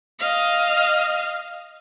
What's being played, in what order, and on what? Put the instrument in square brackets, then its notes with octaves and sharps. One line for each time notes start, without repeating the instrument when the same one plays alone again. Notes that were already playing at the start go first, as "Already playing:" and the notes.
[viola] D#5 F5